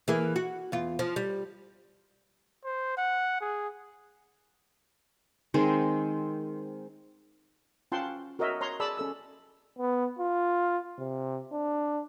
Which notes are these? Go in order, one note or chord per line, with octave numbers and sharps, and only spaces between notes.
E3 A#3 G#4
F#4
E2 F4
F3
G3
C5
F#5
G#4
D#3 G#3 C4
C#4 F4 F#5 G5 A5 C6
F#4 A#4 C#5 D#5 E5
C#5 A#5 C6
G#4 D5 A5 B5 E6
C#4 A4 E6
B3
F4
C3
D4